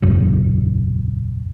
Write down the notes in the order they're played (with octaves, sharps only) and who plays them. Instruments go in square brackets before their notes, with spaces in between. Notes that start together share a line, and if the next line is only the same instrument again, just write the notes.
[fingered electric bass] E1 A#1 F#2 C#3